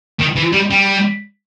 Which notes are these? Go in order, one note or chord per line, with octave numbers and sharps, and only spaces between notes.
D#3
E3
G3
G3